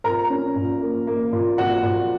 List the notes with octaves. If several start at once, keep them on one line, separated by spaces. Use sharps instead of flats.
A#2 A#4 A#5
C#4
A#2
A#3
A#3
A#2
A#2 F#4 F#5
A#2